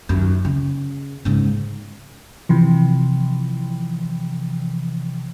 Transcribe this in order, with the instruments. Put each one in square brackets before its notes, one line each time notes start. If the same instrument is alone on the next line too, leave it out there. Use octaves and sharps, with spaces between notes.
[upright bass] F#2 D#3
C#3
G#2 C#3
[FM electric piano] C3 E3 F3